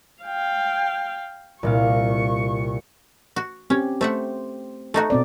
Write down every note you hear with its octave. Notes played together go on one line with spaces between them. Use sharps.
F5 G5
C2 A#2 F5 C#6
F#4
C4 C#4 G4
A3 C5 E5 F#5
A3 D#4 F#4 A4
B2 C4 D5